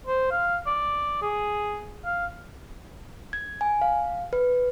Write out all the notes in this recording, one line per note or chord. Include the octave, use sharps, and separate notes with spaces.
C5
F5
D5
G#4
F5
G#6
G#5
F5
B4